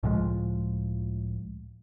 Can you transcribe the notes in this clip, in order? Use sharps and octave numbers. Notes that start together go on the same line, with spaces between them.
C#2 A2 F3 G#3